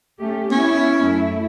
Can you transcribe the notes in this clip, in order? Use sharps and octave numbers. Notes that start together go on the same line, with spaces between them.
A3 C#4 G4
B3 C#4 E4
F#2 A3 E4